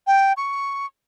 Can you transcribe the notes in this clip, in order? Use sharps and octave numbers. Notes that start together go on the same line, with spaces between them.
G5
C#6